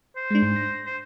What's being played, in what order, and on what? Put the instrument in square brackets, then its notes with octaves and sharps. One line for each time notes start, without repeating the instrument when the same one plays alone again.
[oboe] C5
[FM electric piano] G#3 D4
G#2
A#6
[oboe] C5